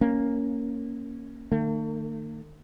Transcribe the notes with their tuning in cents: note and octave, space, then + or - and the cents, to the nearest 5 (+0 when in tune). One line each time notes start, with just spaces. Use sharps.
A#3 +0 C#4 +0
D#3 -40 A3 +45